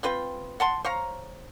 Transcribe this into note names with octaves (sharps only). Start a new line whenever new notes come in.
C4 F4 B4 G5
F#5 A5 C6
C5 C#5 F5 A#5